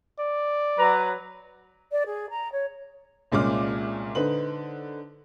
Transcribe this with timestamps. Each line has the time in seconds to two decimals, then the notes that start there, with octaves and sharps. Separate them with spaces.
0.19 D5
0.79 F#3 B4 A#5
1.91 D5
2.06 G#4
2.30 A#5
2.52 C#5
3.32 C2 A#2 G#3 C#4 D6 F6
4.15 D3 D#4 B4 C5 F#7